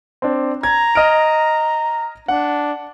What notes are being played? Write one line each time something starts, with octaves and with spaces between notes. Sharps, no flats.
C4 D4
A#5 G#6
D#5 F6 D7
D4 F#5